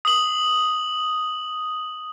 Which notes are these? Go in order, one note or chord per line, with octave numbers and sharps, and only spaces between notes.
D#6 F#7